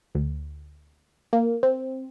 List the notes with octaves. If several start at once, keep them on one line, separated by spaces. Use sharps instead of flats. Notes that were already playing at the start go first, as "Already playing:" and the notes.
D2
A#3
C4